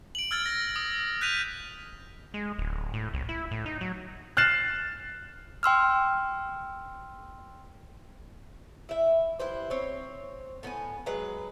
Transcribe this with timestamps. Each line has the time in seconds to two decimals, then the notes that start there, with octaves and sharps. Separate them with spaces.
0.15 D7 F#7
0.31 E6 F6 G#6 A6
0.46 A#6
0.76 D#6
1.21 F#6 G6 B6 D#7 F7
2.34 G#3
2.59 D1
2.94 A2
3.14 C2
3.29 E4
3.51 A2
3.66 D#4
3.81 F#3
4.37 F6 F#6 A6 C7 E7
5.63 G5 C6 E6 F6
8.89 E4 E5
9.39 E4 G4 B4 C5
9.70 C4 C#5
10.63 A2 B3 D#4 G#5
11.06 F#3 G#3 B4